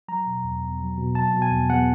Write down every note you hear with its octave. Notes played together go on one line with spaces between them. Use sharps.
F#3 A#5
B2
E2
E2
F#3
B2
F#3 A5
B2
G#5
E2
E2 F#5